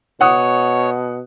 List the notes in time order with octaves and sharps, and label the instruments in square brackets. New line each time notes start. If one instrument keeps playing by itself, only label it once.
[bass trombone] B2 [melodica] C#5 [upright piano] F#5 D#6